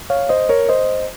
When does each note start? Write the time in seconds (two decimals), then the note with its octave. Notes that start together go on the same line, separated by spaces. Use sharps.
0.10 C#5 F5
0.29 C5 D#5
0.49 A#4 C#5
0.69 C5 D#5